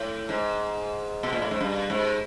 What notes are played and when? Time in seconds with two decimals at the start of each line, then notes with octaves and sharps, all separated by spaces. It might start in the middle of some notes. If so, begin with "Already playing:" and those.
Already playing: A2
0.29 G#2
1.23 B2
1.33 A#2
1.42 A2
1.51 G#2
1.61 G2
1.90 G#2